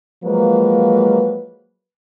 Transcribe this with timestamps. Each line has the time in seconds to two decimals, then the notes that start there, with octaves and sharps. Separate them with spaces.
0.24 F3 F#3 G#3 A#3 B4